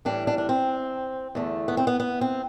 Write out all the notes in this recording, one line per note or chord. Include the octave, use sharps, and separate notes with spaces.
A2 E3 G3 D4
D4
D4
C4
E2 D3 A3
B3
C4
B3
B3
C4